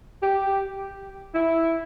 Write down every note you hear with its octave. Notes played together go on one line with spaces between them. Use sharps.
G4
E4